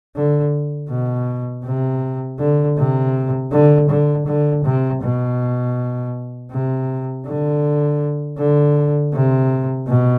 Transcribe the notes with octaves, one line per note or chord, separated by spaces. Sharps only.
D3
B2
C3
D3
C3
D3
D3
D3
C3
B2
C3
D3
D3
C3
B2